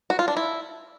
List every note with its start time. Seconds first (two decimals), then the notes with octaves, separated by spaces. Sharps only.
0.10 F#4
0.19 F4
0.28 D4
0.37 E4